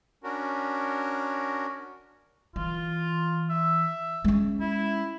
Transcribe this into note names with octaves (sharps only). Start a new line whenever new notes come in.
C#4 D4 F#4 A#4
E3 F4
E5
G#3 C#4
E4